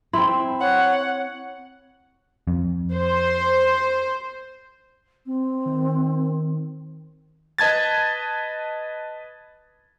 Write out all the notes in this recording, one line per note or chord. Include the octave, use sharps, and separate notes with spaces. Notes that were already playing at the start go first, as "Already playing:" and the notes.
C4 E4 C6
C#5 F#5
F2
C5
C4
D#3
B4 D#5 A5 G#6 A6